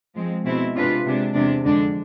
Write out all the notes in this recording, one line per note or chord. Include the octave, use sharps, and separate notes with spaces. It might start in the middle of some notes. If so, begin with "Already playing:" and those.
F3 G#3 C4
B2 G#3 C4 E4
C3 G#3 D4 F4 B4
C3 G#3 D4
E2 C3 G#3 D4
F2 D3 G#3 D4